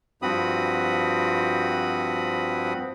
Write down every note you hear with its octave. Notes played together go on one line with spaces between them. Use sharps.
G2 F3 C4 F#4 B5 D#6